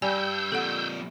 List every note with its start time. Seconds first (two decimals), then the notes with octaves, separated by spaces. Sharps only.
0.02 G2 G3 G#5 E6 G6
0.52 F2 A#2 A4 F#5